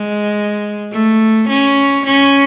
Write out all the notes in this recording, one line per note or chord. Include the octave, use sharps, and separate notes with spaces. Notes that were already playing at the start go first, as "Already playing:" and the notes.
Already playing: G#3
A3
C#4
C#4